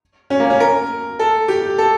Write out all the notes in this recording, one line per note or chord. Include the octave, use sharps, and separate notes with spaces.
C#4
A#3
C#4
A#4
A4
G4
A4